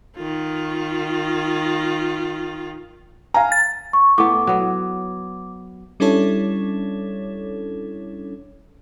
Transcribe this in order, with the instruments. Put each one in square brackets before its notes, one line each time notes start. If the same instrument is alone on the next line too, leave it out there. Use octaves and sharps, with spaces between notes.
[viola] D#3 F4
[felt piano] F5 G#5 A#5
[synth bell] A6
[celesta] C#6
[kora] A2 B3 [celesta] D6
[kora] F#3 B3
[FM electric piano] G3 C#4 D4 E4 A4 C#5